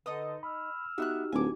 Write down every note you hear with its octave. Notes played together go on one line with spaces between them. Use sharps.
D3 D#4 B4 D#5 A5 D#6
B5 E6 F6
B3 D#4 F#4 G4 E5 F#6
D1 G#5 D6